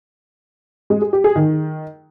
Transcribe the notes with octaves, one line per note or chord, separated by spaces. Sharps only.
G#3
G#4
G4
G#4
D#3